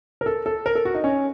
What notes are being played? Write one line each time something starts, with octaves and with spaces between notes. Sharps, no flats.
A#4
A4
A4
A#4
A4
F#4
D#4
C#4